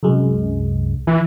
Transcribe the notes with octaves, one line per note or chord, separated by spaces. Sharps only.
C2 F#2 G#3
E3